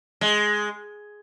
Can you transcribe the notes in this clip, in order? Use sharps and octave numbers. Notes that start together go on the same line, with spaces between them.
G#3